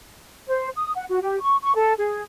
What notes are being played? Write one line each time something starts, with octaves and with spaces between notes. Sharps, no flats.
C5
D#6
F#5
F#4
G4
C#6
C#6
A4
G#4